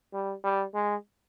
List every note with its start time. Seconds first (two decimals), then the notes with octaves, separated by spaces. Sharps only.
0.13 G3
0.44 G3
0.74 G#3